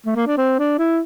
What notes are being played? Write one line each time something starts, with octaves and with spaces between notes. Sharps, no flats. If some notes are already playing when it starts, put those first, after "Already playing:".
A3
A#3
D4
C4
D4
E4